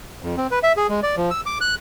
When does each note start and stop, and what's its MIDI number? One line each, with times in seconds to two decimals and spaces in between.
0.23 0.36 41
0.37 0.47 60
0.51 0.59 71
0.63 0.73 76
0.77 0.87 68
0.89 1.00 56
1.03 1.16 74
1.17 1.30 53
1.31 1.41 88
1.46 1.58 86
1.61 1.75 90